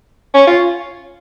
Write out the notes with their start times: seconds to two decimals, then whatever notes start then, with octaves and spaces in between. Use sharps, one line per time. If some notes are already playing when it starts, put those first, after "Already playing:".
0.34 C#4
0.47 F4